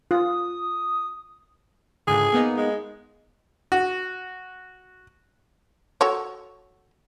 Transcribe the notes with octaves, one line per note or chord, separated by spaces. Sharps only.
F4 D#6
C#2 G#2 D3 G#4
A#3 B3 D#4
G#3
F#4
F#4 A4 C#5